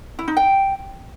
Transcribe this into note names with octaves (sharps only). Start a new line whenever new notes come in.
E4
D#4
G5